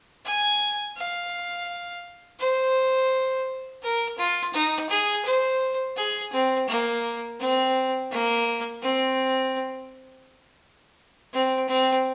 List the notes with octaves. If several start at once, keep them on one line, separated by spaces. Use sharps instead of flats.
G#5
F5
C5
A#4
F4
D#4
G#4
C5
G#4
C4
A#3
C4
A#3
C4
C4
C4